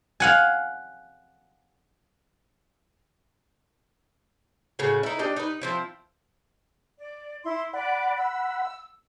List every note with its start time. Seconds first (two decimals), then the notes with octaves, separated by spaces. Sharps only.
0.20 F5 F#5 G#5
4.79 A2 C#3 C#4 F#4
5.03 D#4 E4
5.19 D4 G4 D5 D#5
5.36 D#4 B4
5.61 F3 C4 E4
6.99 D5
7.44 E4 C6
7.73 D5 F#5 B5
8.17 E6